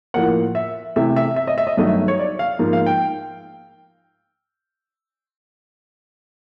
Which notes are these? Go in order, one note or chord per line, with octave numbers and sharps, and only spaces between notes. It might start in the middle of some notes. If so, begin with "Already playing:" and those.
A2 F3 A#3 F#5
E5
C3 E3 A3 E5
E5
E5
D#5
E5
D#5
G2 D#3 F#3 A3 D#5
E5
C#5
D5
F5
G#2 F3 A#3
F5
G5